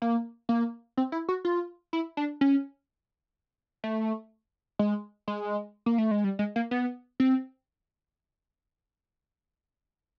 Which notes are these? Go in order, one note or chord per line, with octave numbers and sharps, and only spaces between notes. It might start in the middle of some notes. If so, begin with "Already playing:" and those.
A#3
A#3
C4
E4
F#4
F4
E4
D4
C#4
A3
G#3
G#3
A#3
A3
G#3
G3
G#3
A#3
B3
C4